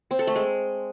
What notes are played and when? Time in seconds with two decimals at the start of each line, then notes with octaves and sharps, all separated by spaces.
0.11 C4
0.19 A4
0.27 A3
0.35 G#3